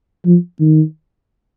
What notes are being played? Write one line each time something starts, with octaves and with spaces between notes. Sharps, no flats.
F3
D#3